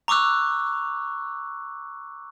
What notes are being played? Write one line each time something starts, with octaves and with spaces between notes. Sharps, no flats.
A#5 C#6 D6 E6 F#6